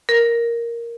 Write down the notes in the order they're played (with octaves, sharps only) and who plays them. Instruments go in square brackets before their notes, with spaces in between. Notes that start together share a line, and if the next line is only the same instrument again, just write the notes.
[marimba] A#4